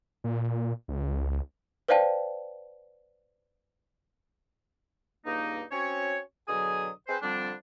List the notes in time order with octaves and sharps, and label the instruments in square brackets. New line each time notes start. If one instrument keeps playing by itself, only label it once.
[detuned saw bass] A#2
C#2
[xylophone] B4 C5 D5 F5 G5 A5
[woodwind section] C#2 G2 A#3 D#4
C4 C#4 F#4 C#5
B2 D3 F#3 G#4 G#5 D#6
C4 G#4 B4 C5
D3 F3 G3 C4 D4